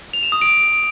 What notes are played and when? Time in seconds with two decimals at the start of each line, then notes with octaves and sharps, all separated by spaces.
0.13 F7
0.23 E7
0.32 D#6
0.42 D7